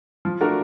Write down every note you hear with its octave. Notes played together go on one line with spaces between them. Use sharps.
F3
A3 D4 F#4 A#4